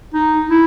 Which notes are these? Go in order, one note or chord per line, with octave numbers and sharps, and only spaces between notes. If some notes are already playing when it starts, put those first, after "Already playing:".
D#4
E4